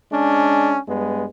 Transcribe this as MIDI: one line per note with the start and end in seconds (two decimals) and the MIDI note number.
0.12 0.77 56
0.12 0.77 61
0.12 0.77 62
0.89 1.26 43
0.89 1.26 56
0.89 1.26 59